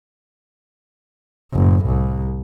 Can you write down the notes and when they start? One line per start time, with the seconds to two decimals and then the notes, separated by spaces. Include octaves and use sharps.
1.53 F#1 A2
1.86 C2